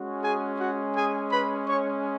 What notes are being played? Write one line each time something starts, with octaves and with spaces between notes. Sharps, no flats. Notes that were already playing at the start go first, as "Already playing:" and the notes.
Already playing: G#3 C#4 F#4
G#4 G#5
F#4 F#5
G#4 G#5
B4 B5
C#5 C#6